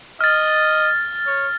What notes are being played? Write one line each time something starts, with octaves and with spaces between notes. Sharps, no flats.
D#5 F6 A6
C#5